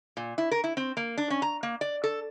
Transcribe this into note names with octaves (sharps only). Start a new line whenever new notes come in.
A#2
E4
A#4
E4
C4
A#3
D4
C#4
A#5
A#3
D5
A4